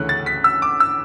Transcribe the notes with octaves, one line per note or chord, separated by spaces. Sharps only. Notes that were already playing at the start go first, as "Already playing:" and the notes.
Already playing: D2 C#3 E3 A3 C#4 F#6
A6
B6
E6
D6
E6